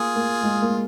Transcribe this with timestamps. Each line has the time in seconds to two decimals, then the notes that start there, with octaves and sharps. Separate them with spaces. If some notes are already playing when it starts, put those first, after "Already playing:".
Already playing: A#3 F4 G#4
0.16 A#3
0.43 G#3
0.62 A#3